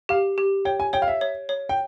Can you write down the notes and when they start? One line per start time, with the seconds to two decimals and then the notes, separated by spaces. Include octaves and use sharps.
0.09 G4 F5
0.38 G4
0.65 C#5 G5
0.80 G#5
0.93 C#5 G5
1.02 F5
1.08 E5
1.21 C#5
1.49 C#5
1.69 G5